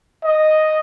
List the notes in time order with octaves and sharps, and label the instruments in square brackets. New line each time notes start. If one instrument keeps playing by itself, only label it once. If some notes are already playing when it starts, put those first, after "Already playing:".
[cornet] D#5